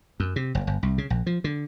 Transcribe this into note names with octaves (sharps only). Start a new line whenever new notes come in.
F#2
C3
F#1
G1
C2
C#3
A#1
F3
D3